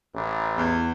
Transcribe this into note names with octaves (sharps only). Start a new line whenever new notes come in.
A1
E2